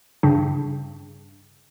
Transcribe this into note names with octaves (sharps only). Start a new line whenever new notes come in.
G2 C#3